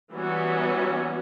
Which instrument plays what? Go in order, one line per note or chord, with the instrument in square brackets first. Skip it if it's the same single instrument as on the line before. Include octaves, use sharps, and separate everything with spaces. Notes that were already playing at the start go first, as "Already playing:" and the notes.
[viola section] E3 F#3 G3 B3 C#4 F#4